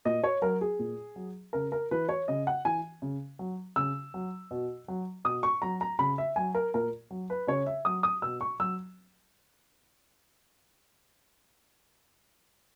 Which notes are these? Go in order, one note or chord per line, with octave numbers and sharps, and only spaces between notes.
A#2 D#5
C#5
F#3 A#4
G#4
A#2
F#3
C#3 A#4
A#4
E3 B4
C#5
C#3 D#5
F#5
E3 G#5
C#3
F#3
C#3 E6
F#3
B2
F#3
B2 D#6
C#6
F#3 A#5
A#5
C#3 B5
E5
F#3 G#5
A#4
A#2 A#4
F#3
B4
C#3 C#5
E5
F#3 D#6
D#6
B2 E6
C#6
F#3 E6